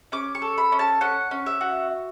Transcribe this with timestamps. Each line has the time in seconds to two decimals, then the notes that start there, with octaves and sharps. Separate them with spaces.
0.12 C#4 D6
0.35 C#6
0.42 A4
0.58 B5
0.72 C#4
0.79 A5
1.01 C#4 F#5
1.31 C#4
1.46 E5
1.61 F#4